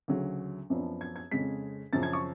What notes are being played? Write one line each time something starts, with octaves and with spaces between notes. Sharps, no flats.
D2 C#3 F#3
F#2 F3 B3 D4
G#6
G#6
F2 C#3 G#3 B6
F#2 C#3 F3 A6
G#6
C#6